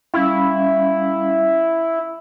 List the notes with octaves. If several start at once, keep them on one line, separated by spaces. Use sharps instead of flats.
G3 C#4 E4 F5